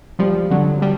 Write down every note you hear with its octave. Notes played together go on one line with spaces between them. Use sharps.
F3 G3
D3 F#3
G3